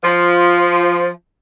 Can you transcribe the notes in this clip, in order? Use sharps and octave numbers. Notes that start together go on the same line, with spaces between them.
F3